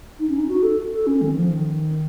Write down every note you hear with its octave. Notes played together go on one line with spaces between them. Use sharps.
D#4
C#4
D#4
F#4
A4
A4
C#4
D#3
F3
D#3